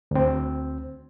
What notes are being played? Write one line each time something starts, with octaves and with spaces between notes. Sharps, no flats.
D2 C4